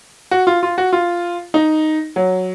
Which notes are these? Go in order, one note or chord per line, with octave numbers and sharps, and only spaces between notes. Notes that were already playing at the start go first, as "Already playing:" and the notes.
F#4
F4
F4
F#4
F4
D#4
F#3